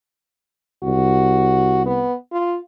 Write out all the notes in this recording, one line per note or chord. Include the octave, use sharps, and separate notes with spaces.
C2 F#4
B3
F4